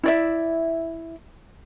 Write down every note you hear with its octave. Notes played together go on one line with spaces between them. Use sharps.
E4 D5 E5